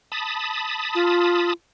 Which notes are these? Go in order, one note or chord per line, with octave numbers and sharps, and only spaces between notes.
A5 B5 D#6
F4